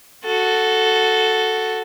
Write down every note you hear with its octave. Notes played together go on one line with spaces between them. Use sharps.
F#4 A4